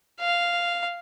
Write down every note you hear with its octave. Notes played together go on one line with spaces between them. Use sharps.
F5